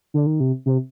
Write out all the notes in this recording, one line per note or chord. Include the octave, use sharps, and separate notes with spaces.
D3
D#3
C3
C3